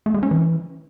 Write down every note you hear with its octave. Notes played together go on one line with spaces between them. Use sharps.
A3
G#3
C#4
E3